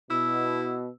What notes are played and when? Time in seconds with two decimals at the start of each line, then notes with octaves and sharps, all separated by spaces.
0.10 B2 E4 E6